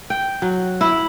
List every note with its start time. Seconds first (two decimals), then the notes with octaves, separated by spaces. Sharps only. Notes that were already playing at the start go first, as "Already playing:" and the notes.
0.10 G5
0.42 F#3
0.81 E4